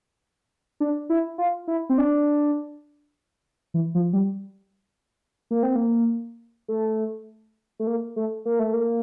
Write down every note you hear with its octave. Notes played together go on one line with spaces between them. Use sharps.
D4
E4
F4
E4
C4
D4
E3
F3
G3
A#3
C4
A#3
A3
A3
A#3
A3
A#3
A3
A#3